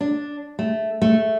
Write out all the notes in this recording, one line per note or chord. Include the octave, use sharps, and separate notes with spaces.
D4
A3
A3